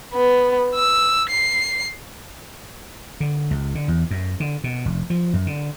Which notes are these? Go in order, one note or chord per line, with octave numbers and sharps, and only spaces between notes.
B3
E6
C7
D3
C#2
D3
E2
F#2
D3
B2
F1
F3
F#2
D3